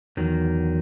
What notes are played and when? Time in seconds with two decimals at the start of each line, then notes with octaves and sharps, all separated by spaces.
0.17 E2 D#3 F#3